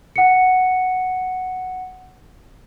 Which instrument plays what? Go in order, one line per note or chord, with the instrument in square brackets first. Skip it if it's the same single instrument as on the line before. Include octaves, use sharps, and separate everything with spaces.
[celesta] F#5 C#7